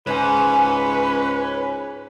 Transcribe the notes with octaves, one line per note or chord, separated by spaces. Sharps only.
C#2 G#2 B4 C#5 G#5